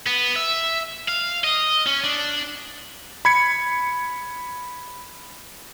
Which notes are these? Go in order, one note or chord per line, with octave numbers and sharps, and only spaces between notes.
B3
E5
F5
D#5
C#4
D4
B5 G#6 C#7